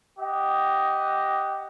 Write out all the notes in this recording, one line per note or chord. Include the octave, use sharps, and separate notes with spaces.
G4 D#5 F#5